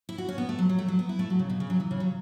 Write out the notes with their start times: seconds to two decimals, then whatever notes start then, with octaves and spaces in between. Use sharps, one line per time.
0.09 E4
0.18 F#4
0.29 C#4
0.38 B3
0.49 A3
0.59 F#3
0.69 F#3
0.79 A3
0.88 F#3
0.99 B3
1.09 E4
1.19 A3
1.30 F#3
1.39 C#3
1.49 B2
1.60 C#3
1.70 F#3
1.80 E3
1.91 C#3
2.00 F#3